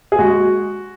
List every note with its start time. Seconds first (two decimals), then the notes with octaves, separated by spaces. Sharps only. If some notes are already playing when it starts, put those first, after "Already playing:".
0.12 G#4
0.19 G#3 F#4